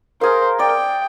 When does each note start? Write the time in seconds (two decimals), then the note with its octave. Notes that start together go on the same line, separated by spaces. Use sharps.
0.21 G#4 A#4 C5 F5
0.59 D5 G5